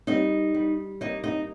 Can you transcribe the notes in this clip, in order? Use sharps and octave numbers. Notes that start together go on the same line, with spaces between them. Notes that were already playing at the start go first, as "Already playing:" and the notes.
G3 D#4 D#5
G3
A#3 D#4 D#5
D#4 D#5